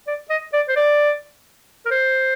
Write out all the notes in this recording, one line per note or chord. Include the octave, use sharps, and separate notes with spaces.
D5
D#5
D5
C5
D5
A#4
C5